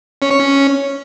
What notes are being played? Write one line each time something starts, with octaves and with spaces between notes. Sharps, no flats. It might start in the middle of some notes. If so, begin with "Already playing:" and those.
C#4
C#5
C#4